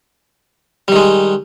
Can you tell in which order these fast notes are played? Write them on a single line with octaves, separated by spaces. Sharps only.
G3 D#3 G#3